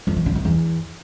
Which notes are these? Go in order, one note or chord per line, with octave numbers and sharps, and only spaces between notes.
F2
F3
D3
D#3
E2